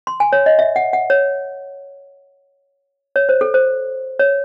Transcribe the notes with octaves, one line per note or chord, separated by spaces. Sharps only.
C6
G#5
C#5
D#5
E5
F#5
F#5
C#5
C#5
C5
A4
C5
C#5